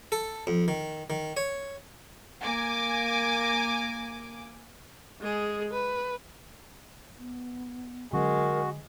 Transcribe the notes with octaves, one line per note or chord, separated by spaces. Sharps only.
A4
F2
D#3
D#3
C#5
A#3 G#5 D6
G#3 G#4
B4
B3
D3 F#3 G#3 C#4 F#4 A#4